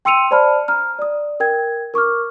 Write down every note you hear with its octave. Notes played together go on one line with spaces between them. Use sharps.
G5 C6 E6 C#7 D#7 F7
C5 D5 A5 B5 F6
A#5 F6
D5 D#6
A#4 G5 G#6
A#4 C#6 D6 F6